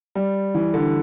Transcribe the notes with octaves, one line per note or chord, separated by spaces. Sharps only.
G3
E3
D3